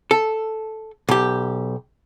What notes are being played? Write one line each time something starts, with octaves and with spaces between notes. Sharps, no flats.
A4
B1 G4